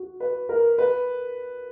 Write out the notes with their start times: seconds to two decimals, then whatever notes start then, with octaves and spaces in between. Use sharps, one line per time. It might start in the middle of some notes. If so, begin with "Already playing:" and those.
Already playing: F#4
0.20 B4
0.49 A#4
0.78 B4